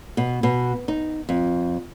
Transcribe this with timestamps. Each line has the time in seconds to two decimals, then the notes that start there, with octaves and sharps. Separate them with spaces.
0.17 B2
0.43 B2
0.88 D#4
1.29 F2